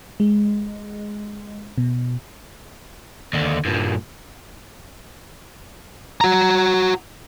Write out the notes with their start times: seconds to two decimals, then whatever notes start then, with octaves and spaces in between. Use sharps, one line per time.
0.20 G#3
1.78 B2
3.33 D#2 D3
3.65 G2 A#2
6.21 F#4 A#5